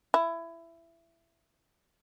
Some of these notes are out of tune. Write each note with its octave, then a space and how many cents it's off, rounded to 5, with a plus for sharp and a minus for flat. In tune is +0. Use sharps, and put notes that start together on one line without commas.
E4 +20